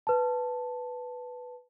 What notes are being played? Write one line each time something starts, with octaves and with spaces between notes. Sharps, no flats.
B4 A5